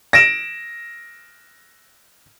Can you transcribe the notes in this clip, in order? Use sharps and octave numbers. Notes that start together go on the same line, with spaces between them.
A#6 D7 E7